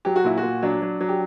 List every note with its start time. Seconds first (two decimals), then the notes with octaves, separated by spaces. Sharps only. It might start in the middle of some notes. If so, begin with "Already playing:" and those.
0.05 F#3 G4
0.16 F#4
0.24 A#2 E4
0.38 F#4
0.43 A#2
0.63 F#3 D4
0.82 F#3
1.01 F#3
1.09 G4